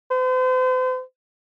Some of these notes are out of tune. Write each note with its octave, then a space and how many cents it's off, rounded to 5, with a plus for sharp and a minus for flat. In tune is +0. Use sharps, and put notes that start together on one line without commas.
C5 -40